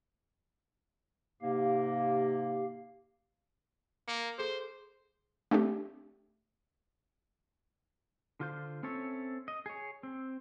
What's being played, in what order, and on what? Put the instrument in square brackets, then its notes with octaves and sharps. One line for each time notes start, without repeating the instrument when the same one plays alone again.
[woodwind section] G#2 C3 A#3 [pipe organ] G4 F5
[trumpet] A#3 [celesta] C#7
[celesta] G#4 A4 [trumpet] C5
[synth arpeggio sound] A3 C4 D4 G4
[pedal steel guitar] D3 F4 C5
C4 C#4 A4 C#5 E5
D#5
G#4 C#5
C4